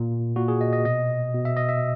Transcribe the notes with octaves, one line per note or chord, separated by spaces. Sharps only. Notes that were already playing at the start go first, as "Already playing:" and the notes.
Already playing: A#2
A#2 F#4
G#4
D#5
D#5
B2 D#5
B2
E5
D#5
E5